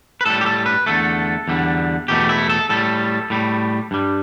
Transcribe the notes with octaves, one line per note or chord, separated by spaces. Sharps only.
B4
A2 G3 A4
G4
A4
B4
E2 D3 A3 A4
E2 D3 G3
E2 B2 A3 G4
E4
A4
A2 G3 A4
A2 G3
G2 G3